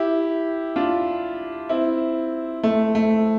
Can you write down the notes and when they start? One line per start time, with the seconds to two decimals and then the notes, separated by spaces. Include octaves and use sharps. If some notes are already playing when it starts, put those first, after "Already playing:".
Already playing: E4 G4
0.76 D4 F4
1.69 C4 E4
2.63 A3
2.95 A3